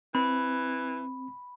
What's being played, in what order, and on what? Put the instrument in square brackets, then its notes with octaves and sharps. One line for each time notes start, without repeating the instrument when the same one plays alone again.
[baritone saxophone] E3 [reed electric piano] C4 [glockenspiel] B5